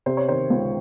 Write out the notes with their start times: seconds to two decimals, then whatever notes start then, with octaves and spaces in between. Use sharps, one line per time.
0.06 C3 C5
0.17 C#5
0.28 D#3 C5
0.50 C#2